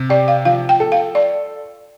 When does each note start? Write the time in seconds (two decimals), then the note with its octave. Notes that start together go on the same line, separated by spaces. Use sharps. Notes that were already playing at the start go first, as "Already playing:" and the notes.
Already playing: C3
0.10 G4 D5
0.28 F5
0.45 F3 F5
0.69 G5
0.80 A4
0.92 F5
1.15 D5